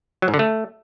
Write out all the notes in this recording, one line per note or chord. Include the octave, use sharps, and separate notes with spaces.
F#3
G#2
D3
A3